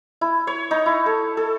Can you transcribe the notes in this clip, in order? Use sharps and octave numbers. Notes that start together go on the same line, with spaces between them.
E4
C#5
D#4
E4
A4
A4